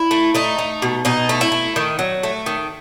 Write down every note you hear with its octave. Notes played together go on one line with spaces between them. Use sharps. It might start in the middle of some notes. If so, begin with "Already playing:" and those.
Already playing: E4
A3
A3 D#4
A3
B2
B2 D#4
A3
E4
A3
D#3
F#3
A3
D#3